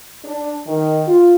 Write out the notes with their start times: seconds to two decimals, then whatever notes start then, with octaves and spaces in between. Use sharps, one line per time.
0.25 D4
0.67 D#3
1.07 F4